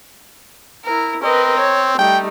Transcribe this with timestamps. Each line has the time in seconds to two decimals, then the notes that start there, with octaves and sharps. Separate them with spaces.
0.84 E4 A#4
1.22 C4 A#4 B4 D#5
1.59 C#5
1.99 G3 A3 D#4 G5